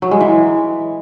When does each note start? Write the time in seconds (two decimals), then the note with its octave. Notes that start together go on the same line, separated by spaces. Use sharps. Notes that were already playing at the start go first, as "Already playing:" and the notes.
0.02 F#3
0.11 G#3
0.21 E3